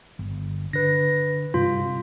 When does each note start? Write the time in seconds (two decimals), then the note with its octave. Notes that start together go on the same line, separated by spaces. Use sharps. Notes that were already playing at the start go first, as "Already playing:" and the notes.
0.19 G1
0.73 D3 B4 A#6
1.54 G2 C3 F4